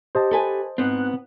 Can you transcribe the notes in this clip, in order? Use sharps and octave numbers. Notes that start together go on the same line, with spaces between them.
G4 C5 D#5 A5
A4 B4 G#5
G#2 B3 C4 F#6